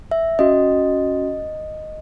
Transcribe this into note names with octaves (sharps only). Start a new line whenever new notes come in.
E5
C#4 F#4 D#5